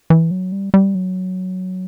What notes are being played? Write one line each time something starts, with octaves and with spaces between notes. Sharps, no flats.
E3
F#3
G3
G3
F#3